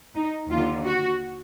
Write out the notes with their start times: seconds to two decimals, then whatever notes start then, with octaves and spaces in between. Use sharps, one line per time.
0.15 D#4
0.50 D#2 D3 F4
0.85 F#4